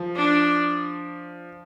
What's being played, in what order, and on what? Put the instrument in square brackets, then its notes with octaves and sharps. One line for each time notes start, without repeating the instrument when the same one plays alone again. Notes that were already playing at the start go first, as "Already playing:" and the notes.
Already playing: [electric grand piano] F3
[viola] D4